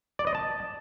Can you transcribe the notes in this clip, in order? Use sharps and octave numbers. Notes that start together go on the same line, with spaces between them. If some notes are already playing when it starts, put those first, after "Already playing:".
D5
D#5
A5